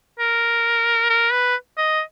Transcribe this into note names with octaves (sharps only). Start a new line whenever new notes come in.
A#4
A#4
B4
D#5